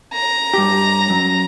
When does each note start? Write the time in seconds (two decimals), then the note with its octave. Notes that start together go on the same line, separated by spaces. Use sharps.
0.14 A#5
0.54 G2 G4
1.10 F#2